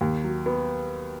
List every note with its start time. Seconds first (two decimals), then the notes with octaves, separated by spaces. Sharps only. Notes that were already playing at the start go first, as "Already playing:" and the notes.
0.01 D#2
0.24 F#3
0.46 B3